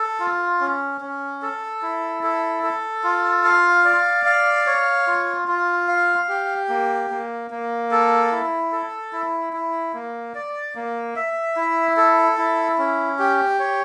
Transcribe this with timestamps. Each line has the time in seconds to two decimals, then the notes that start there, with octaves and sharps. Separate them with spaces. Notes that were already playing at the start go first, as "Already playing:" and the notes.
Already playing: A4
0.20 F4
0.61 C#4
1.01 C#4
1.42 A4
1.82 E4
2.23 A4
2.63 A4
3.04 F4
3.44 F5
3.85 D5
4.26 F5
4.67 C#5
5.07 F4
5.48 F4
5.88 F5
6.29 G4
6.69 A#3
7.10 A#3
7.51 A#3
7.91 A4
8.32 E4
8.72 A4
9.13 E4
9.53 E4
9.94 A#3
10.35 D5
10.75 A#3
11.16 E5
11.56 E4
11.97 A4
12.38 E4
12.78 C#4
13.19 G4
13.59 C#5